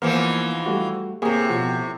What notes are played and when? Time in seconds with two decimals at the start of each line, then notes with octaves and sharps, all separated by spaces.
0.02 G#2 E3 F3 A#3 B3 F6
0.66 G3 A3 F#4
1.22 A2 C3 A#3 G4 G#4
1.49 B2 F3 F#5